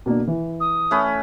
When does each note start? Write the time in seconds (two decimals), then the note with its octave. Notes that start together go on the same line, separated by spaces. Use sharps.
0.06 B2 A#3 D4
0.27 E3
0.60 D#6
0.91 A3 C#4 B4